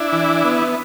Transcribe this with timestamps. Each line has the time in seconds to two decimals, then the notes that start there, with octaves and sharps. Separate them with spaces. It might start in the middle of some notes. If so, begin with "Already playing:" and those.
Already playing: D4 E4
0.13 E3
0.44 B3